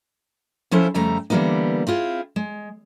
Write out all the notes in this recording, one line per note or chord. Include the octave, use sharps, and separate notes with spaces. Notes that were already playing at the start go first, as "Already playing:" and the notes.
F3 C#4 E4 A4 C5
F2 C#3 G3 A3 A#5
D3 E3 G3 A#3 B3 D#4
C4 E4 F4 G#4
G#3